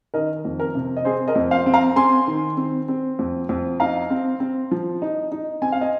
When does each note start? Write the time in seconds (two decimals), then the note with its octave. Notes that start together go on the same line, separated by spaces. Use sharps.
0.14 D#3 A#4 D#5
0.45 F2
0.60 A#4
0.75 C3
0.96 D#5
1.05 C4 G#4 C5
1.28 A#4 D#5
1.35 F2
1.51 C5 F5
1.66 C4
1.74 F5 A#5
1.96 C4 G#5 C6
2.28 D#3
2.57 C4
2.88 C4
3.19 F2
3.49 F2
3.80 D#4 F5 A#5
4.10 C4
4.40 C4
4.71 F3
5.02 D#4
5.32 D#4
5.62 C4 G#5
5.72 F5
5.81 D#5 G#5